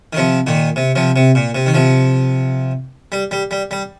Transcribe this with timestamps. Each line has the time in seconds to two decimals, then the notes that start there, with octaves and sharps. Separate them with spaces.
0.13 D#3
0.17 C3 F3
0.47 A#2 D#3
0.76 C3
0.96 C3 F3
1.16 C3
1.35 A#2
1.55 C3
1.66 D#3
1.74 C3 F3
3.12 G3
3.31 G3
3.51 G3
3.71 G3